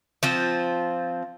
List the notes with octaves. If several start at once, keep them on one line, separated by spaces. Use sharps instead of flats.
F3 C4 F4